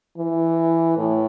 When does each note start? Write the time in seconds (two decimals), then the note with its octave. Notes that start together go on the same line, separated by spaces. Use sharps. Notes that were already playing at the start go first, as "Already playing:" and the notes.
0.18 E3
0.98 A2